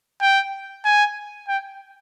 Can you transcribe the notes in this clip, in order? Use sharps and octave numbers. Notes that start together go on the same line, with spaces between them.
G5
G#5
G5